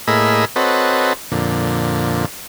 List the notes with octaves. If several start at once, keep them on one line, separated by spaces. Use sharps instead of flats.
A2 A#3 G#4 D#5 B5 E6
C4 F#4 A4 B4 C#5 D#5
F2 A#2 D3